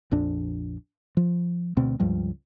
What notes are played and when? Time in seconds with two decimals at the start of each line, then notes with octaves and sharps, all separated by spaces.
0.11 A#1 F2 D4
1.17 F3
1.77 D2 B2 C4
2.00 C#2 G2 F3 G3